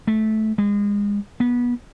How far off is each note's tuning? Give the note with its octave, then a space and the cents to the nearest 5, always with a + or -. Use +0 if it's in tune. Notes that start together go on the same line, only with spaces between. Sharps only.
A3 -15
G#3 -30
B3 -25